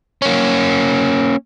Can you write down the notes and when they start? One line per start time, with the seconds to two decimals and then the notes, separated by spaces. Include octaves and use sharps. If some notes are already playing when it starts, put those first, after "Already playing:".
0.22 A#3 C#4